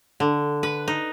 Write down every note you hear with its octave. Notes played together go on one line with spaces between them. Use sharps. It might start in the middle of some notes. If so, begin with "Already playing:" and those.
D3
B4
D#4